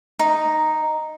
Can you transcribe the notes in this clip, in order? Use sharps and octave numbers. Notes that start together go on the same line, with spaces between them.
D#4